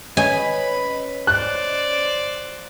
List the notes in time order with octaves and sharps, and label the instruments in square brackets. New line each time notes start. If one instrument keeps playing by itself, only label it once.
[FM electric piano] C#4 C#5 D#5 [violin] B4 B5 [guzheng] G#5
[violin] C5 D5 [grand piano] F#6